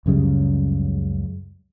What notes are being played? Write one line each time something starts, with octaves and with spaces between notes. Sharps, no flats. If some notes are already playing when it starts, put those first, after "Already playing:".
C#2 F#2 C#3 G3